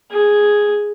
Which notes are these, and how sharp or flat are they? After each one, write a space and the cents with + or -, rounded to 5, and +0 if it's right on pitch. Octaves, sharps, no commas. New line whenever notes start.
G#4 +0